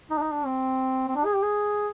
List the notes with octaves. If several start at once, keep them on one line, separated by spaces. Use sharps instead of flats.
D#4
D4
D#4
D4
C4
C4
D4
G#4
G4
G#4